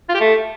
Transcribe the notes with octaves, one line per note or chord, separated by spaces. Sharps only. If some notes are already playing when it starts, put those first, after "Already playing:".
F4
G4
A3